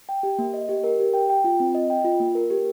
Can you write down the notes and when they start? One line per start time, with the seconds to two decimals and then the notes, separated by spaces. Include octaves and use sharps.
0.09 G5
0.23 G4
0.39 A#3
0.54 D#5
0.69 G4
0.84 A#4
0.99 G4
1.14 G5
1.30 G5
1.44 F4
1.60 C4
1.75 D#5
1.90 G5
2.05 F4
2.20 A#3
2.35 A#4
2.50 G4